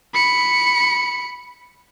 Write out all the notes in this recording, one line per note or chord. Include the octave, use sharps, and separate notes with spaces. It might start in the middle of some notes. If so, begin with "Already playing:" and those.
B5 C#7